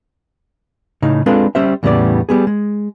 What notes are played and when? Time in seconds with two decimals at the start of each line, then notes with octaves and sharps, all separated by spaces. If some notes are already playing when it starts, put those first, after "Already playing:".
1.02 A2 C#3 D#4
1.26 G#3 C4 D4 F4 A4 B4
1.55 G3 C#4 C5 E5
1.83 E2 A2 C#3 G3 B3 D5
2.29 G3 B3 G#4
2.47 G#3